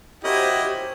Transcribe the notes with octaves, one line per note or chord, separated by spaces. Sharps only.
C#4 E4 F#4 G4 A#4 C5 D#5